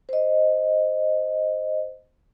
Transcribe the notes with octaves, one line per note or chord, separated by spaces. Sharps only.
C5 D#5